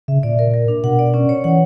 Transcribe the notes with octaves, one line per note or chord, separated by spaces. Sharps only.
C#3 E5
A#2 D5
A#4
A#4
D4
B2 F#5
D5
C#4
C#5
E3 F#5